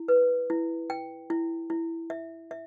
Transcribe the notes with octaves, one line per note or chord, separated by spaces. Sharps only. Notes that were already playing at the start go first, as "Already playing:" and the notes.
Already playing: E4
B4
E4
G5
E4
E4
E5
E5